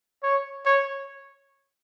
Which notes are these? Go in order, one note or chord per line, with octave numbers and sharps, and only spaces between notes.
C#5
C#5